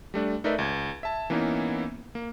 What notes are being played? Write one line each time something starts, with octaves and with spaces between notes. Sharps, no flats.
G3 A3 D4
A3 D#4 A#4 B4 D5 E5
C#2 G#6
E5 A5
E3 A#3 B3 C#4 D#4 E4
A#3